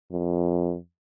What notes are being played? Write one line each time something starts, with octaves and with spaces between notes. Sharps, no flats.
F2